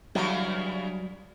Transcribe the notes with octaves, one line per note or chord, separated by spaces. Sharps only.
G2 C#3 E3 F#3 G3